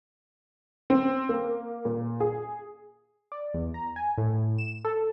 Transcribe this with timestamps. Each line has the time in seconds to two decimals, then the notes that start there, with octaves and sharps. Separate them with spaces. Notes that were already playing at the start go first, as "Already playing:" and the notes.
0.90 C4
1.29 A#3
1.85 A#2
2.20 G#4
3.32 D5
3.54 E2
3.74 A#5
3.96 G#5
4.18 A2
4.58 E7
4.85 A4